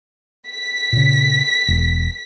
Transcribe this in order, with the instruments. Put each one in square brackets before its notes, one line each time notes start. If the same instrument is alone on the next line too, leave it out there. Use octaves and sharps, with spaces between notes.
[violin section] B6
[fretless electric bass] A#2 C#3
E1